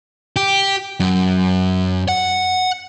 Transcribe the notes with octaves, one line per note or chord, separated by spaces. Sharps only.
G4
F#2
F#5